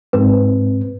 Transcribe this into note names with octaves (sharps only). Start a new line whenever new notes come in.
G#2 C4 B4